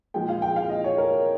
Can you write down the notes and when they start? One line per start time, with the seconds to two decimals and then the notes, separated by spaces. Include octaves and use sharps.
0.14 A#2 F3 G#3 G5
0.28 F5
0.42 G5
0.56 F5
0.69 D#5
0.84 C#5
0.98 A#4